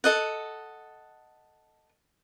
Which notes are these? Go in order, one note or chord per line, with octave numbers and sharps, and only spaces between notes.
A4 D#5 F#5